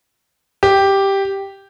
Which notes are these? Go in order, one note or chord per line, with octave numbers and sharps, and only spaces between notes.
G4